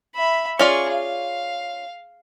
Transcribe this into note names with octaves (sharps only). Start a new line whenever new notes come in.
E5 B5
C#4 F4 G#4 D5 C#6
F5